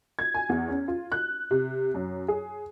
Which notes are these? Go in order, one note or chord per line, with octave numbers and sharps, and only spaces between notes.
G#6
G#5
E2
C#4
F4
F#6
C3
F#2
G#4